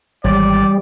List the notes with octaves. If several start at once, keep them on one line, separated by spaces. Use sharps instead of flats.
G#1 E3 G3 D5